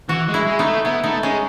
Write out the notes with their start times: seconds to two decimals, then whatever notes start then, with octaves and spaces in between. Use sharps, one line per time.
0.09 E3 F#4
0.28 G#3
0.34 E4
0.46 G#3
0.59 B3 D#4
0.65 A3
0.85 B3 E4
1.04 A3 D#4
1.23 G#3 C#4